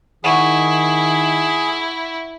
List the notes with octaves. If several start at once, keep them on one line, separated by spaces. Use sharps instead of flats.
D#3 E4 G#4 F#5 C#6